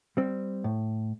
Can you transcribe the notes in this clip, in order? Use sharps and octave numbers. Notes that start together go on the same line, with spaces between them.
G3 C4
A2